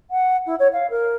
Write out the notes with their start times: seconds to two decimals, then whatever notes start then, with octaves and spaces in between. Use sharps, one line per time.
0.10 F#5
0.46 E4
0.59 C#5
0.73 F5
0.90 A#4